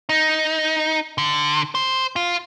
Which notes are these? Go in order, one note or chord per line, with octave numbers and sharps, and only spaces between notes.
D#4
D3
C5
F4